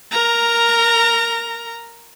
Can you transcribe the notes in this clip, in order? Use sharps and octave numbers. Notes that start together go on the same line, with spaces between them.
A#4 A#5